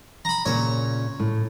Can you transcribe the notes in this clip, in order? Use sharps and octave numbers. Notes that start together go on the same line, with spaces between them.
A#5 B5
A#2 C#3 C#5
A2